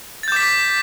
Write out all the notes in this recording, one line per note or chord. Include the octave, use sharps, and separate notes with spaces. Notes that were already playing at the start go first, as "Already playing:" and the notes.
D6 G6 A6 B6